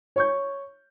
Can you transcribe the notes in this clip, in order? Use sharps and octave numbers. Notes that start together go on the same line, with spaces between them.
C#5 C#6 G6